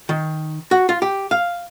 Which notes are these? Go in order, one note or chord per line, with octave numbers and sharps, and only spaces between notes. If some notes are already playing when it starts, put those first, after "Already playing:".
D#3
F#4
F4
G4
F5